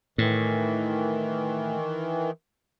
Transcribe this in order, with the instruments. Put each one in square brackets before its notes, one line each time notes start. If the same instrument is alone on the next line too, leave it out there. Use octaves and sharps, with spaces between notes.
[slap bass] A2 [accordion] D#3 E3